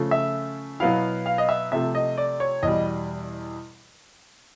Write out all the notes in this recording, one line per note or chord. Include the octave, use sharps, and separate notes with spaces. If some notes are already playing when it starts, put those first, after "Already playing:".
Already playing: C#3 F3 A3
E5
B2 F#3 B3 E4 F5
F5
D#5
E5
C3 F3 A3 E5
D#5
D5
C#5
E2 B2 G3 D#5